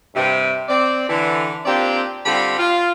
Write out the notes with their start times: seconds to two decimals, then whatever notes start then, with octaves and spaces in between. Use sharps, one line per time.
0.15 G2 C3
0.68 C4 D5
1.09 D3 E3
1.65 A#3 C4 D4 F4 G4 D5
2.25 D3 G3 C4 F4 G4 B5
2.58 F4